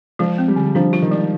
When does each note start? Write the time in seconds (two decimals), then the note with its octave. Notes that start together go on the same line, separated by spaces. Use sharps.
0.19 F3 G#3
0.38 C4
0.48 G3
0.56 D3
0.75 F3 D4
0.93 F4
1.02 D#3
1.11 G#3